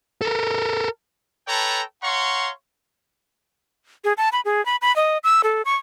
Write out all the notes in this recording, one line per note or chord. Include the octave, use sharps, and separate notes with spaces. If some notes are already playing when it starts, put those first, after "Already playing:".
A4 A#4
A4 B4 C#5 G5 A5 A#5
C#5 F5 F#5 A#5 C6 C#6
G#4
A5
B5
G#4
B5
B5
D#5
E6
A4
C#6